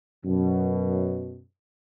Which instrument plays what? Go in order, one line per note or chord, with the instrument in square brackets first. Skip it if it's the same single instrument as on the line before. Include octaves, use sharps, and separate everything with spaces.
[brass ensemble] F#2 B2